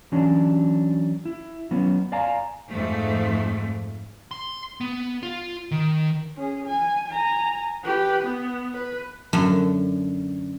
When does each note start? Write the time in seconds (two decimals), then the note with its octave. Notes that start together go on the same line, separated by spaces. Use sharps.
0.12 E3 F#3 C#4 D4
1.25 E4
1.71 F#3 B3 C#4
2.12 D5 F5 G#5 A#5
2.70 F2 G#2 F3 A3
4.31 C6
4.81 B3
5.23 F4
5.71 D#3
6.36 C#4 G#4
6.66 G#5
7.08 G#5 A#5
7.84 G4 B4
8.23 B3
8.74 B4
9.33 F#2 D3 A3 F#4 A4 C6